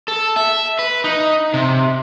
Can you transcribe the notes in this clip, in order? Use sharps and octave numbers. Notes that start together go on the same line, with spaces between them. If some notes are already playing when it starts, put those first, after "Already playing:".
A4
E5
B4
D#4
C3